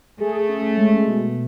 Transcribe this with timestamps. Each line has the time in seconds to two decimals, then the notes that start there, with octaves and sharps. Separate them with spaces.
0.20 A3 G#4
0.49 C#4
0.78 G#3
1.06 B2